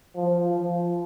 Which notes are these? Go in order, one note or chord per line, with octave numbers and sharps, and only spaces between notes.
F3
F3